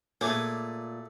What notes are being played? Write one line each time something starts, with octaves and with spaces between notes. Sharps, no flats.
A#2 A3 G#4 C#5 D6 G#6